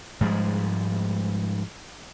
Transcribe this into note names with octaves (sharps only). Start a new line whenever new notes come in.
G#2 F3 G3 G#3